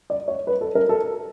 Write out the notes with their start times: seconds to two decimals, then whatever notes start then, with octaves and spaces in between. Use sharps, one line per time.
0.10 D5
0.28 C#5
0.47 B4
0.61 A4
0.75 A#4
0.89 A4